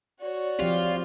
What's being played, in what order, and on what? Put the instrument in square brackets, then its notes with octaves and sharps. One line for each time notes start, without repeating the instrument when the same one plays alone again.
[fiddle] F#4 C#5 [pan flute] D5
[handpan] F3 C4 G4 [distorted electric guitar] F4